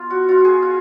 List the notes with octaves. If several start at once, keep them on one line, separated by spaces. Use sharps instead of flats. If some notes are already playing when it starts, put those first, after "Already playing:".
Already playing: B3 F4
F#4
F4 F#4
G#4
F4